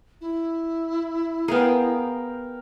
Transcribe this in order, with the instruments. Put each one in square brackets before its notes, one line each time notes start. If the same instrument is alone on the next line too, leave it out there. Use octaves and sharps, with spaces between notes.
[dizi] E4
[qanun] B3 G#4 [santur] A#4 F5 G5